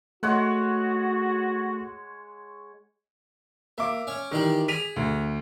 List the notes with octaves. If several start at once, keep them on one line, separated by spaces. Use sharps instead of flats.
G#3 A3 F#4 C#5 F#5
A#3 E5 D6
C#4 C#5
D#3 E3 G3 G4
G#4 B6 D#7 F7
D2